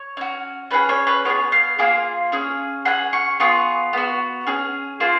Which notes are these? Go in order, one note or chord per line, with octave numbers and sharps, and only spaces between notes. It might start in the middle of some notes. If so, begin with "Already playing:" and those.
Already playing: C#5
C#4 F#4
C#4 F4 G#4 B4
C#5
B4
B3 F4 G#4 C#5
F5
A#3 F4 G#4
C#4 G#4
C#4 G#4 F#5
C#6
B3 F4 G#4 C#6
B3 F#4
C#4 G#4
A#3 F4 G#4